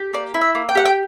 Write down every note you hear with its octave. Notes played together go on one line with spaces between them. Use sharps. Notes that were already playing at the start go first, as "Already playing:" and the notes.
Already playing: G4
A#3 D5
E4
E5
A#3
G5
G4 F#5
G5